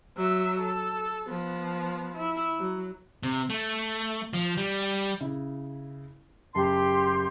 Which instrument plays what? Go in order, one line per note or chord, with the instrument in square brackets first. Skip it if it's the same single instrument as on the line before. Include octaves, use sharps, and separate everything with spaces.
[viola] F#3 E5
A4
F3 B3
E4
F#3
[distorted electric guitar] C3
A3
F3
G3
[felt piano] C#3 E4
[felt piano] F#1 A5 [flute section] G4 C6